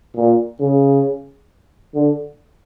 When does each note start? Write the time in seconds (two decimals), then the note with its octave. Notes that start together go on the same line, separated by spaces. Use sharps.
0.16 A#2
0.60 C#3
1.95 D3